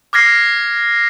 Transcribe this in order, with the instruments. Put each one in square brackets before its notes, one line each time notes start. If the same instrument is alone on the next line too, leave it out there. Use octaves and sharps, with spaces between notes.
[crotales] D6 F6 G#6 A#6 C7